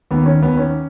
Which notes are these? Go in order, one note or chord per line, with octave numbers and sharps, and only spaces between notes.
D#2 D#3 B3
C#4
D#2 D#3 B3
C#4